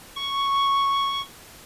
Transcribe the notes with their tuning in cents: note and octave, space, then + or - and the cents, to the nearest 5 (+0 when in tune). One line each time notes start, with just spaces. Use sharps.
C#6 +0